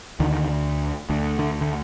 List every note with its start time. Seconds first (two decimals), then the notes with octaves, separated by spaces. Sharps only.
0.20 D2 D3 D#3
1.09 D2 D3
1.39 D3
1.61 D3